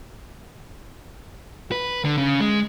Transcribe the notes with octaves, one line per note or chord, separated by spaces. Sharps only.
B4
D3
C#3
G#3